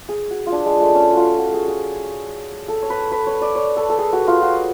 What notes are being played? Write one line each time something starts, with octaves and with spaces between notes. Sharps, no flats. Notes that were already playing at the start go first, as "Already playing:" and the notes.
G#4
F#4
F4
D4
G#3
A3
C#4
F4 F#4
F#4
G#4
G#4
A4
C#5
B4
B4
C#5
D5
C#5
A4
A4
G#4
F#4
F4
F#4